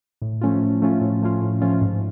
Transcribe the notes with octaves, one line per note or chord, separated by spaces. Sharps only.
A2
F3 A3 C#4 F4
A2
F3 A3 C#4 F4
A2
F3 A3 C#4 F4
A2
F3 A3 C#4 F4
G#2